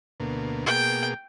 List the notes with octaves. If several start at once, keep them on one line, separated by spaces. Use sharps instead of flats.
D2 B2 A#3
B2 A#3 G#4 G5